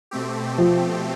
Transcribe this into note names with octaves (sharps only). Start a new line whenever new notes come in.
B2 A3 C4 G4
F3